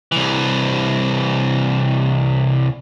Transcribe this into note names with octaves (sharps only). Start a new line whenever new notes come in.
C2 E3